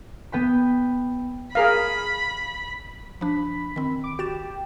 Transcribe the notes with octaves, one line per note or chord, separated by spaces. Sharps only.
B3 G5 B5
G#4 A#4 F5 B5
F3 D4 B5
D#3 C4
D6
F#4 G4 A6 E7